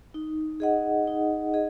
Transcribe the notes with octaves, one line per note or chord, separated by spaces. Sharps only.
D#4
G#4 D#5 F#5
D#4
G#4 D#5 F#5